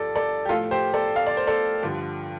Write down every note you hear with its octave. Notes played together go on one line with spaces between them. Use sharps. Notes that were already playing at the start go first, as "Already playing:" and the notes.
Already playing: G2 F3 A4 D5
A4 D5
G4
A2 F3 F4 A4
G4 C5
A4 D5
F5
D5
C5
A4 D5
G2 D3 F3